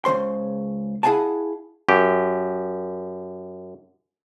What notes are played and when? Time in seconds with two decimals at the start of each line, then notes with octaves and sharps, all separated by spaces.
0.05 C#2 C#3 G#3 C5 C6
1.03 E4 G#4 F5 F#5 G#5 A5
1.89 F#2 G4